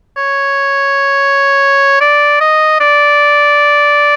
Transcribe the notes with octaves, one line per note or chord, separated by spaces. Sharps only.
C#5
D5
D#5
D5